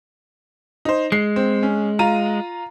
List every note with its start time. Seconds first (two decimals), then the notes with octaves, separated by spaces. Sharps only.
0.85 D#4 C5
1.12 G#3 C7
1.36 C4
1.63 C#4
1.99 F4 A#5 D#7